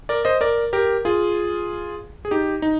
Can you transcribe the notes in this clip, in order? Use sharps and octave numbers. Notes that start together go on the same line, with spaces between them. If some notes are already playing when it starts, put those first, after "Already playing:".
A#4 D5
C5 D#5
A#4 D5
G4 A#4
F4 G#4
G#4
D#4 G4
D#4